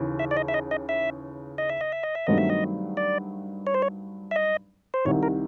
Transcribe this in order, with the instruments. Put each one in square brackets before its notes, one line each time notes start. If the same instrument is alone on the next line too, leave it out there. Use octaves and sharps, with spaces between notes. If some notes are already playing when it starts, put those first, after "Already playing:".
Already playing: [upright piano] D#2 C#3 E3
[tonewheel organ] E5
D5
D#5
E5
D#5
D#5
E5
D#5
E5
D#5
E5
D#5
E5
[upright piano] G2 D#3 F#3 A3 C4 [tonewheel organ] D#5
[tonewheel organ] E5
D#5
D5
C#5
C5
C#5
E5
D#5
C5
[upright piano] C2 C3 D#3 [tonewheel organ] C#5
[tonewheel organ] A#4